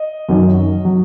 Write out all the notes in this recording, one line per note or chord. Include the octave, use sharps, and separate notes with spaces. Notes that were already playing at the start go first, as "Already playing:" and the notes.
Already playing: D#5
F#2 D#3 F#3
F#3